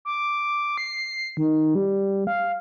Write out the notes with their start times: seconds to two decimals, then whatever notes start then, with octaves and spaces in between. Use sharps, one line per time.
0.05 D6
0.78 C7
1.37 D#3
1.75 G3
2.27 F5